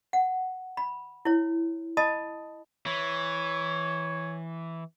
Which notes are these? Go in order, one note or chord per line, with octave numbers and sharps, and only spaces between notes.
F#5
B5
E4 C#5
D#5 A5 B5 D#6
E3 C#5